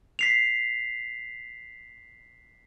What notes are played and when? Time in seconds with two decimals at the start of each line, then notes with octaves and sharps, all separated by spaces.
0.19 B6 C7 F7